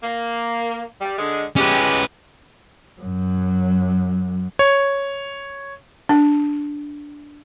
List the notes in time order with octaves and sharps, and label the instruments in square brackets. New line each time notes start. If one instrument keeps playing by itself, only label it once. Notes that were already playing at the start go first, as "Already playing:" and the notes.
[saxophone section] A#3
G3
D3 G#3
[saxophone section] G#3 G4 [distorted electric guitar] C#4 B4
[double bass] F#2 F#3
[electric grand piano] C#5
[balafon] D4